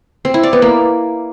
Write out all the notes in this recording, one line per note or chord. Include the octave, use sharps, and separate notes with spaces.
C4
E4
D5
B3
A#3